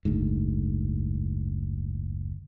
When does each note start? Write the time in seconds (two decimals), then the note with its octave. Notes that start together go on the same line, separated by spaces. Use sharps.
0.05 F#1 D2 G#2